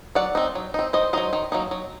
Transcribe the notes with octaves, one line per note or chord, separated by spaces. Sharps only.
F#3 D5 F#5
C4 D#4
F#3
C4 D#4
D#3 C5 D#5
F#3 A#3 D#4 C5 D#5
D#3
F#3 A#3 D#4
F#3